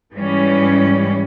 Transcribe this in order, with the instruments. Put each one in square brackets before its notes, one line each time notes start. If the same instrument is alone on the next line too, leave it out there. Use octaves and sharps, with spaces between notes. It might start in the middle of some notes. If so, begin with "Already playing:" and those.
[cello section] G#2 E3 G3 C#4